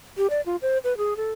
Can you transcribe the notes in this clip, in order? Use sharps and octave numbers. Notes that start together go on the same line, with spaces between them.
G4
D5
F4
C5
B4
G#4
A4